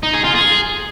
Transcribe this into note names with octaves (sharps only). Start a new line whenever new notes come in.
D#4
G#4
F4
G#4